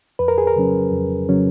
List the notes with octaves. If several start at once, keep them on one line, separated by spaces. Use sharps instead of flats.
F2 B4
A#4
G#4
A#4
C#3 F#3 C#4
F2
C#3 F#3 C#4